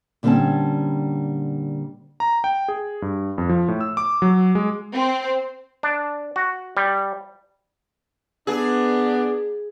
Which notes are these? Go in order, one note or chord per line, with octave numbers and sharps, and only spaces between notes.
A#2 D3 G3 C4 C#4 A5
A#5
G5
G#4
G2
F2
F3
A2
E6
D6
F#3
G#3
C4
D4
F#4
G3
B3 D4 G#4